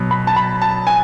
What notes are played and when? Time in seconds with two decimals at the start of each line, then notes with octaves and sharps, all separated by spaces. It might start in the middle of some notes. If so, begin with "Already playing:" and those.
Already playing: B2 F#3
0.11 B5
0.27 A5
0.36 B5
0.62 A5
0.87 G#5